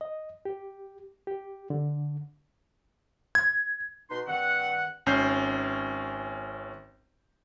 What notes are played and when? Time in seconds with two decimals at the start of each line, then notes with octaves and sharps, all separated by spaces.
0.01 D#5
0.45 G4
1.27 G4
1.70 D3
3.35 G#6
4.11 B2 D#4 B4 C6
4.27 G2 D#3 C4 F#5
5.06 G#1 C#4 G6 C7